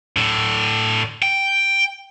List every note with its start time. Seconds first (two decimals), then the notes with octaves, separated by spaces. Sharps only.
0.17 A2 D3
1.22 G5